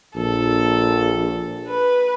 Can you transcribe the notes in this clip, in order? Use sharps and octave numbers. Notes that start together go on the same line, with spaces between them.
A#1 A4
B4